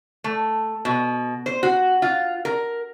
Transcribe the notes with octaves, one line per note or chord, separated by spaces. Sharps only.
A3
B2
C5
F#4
F4
A#4